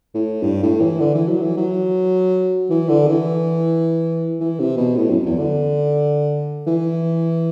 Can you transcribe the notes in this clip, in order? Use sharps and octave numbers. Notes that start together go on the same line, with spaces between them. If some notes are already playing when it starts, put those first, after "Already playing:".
A2
G2
A2
E3
D3
E3
F#3
E3
F#3
E3
D3
E3
E3
C3
B2
A2
F#2
E2
D3
E3